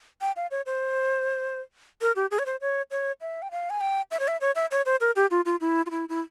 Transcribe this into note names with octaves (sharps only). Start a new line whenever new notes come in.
G5
F5
C#5
C5
A#4
G4
G#4
C#5
C5
C#5
C#5
E5
G5
F5
G#5
G5
E5
C#5
E5
C#5
E5
C#5
C5
A#4
G4
F4
F4
E4
F4
E4
E4